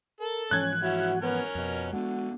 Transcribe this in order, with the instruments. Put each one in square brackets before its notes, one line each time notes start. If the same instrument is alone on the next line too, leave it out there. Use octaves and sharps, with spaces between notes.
[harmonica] A4 A5 [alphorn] A#4
[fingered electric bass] G#2 E3 F3 [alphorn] C#4 [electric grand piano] F#6 G#6
[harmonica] C#4 E4 F#5 [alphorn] F#4
[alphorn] B3 [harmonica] C#4 A#4 G#5
[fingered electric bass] F2 [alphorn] B2
[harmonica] D3 [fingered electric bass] G#3 B3 [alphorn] F#4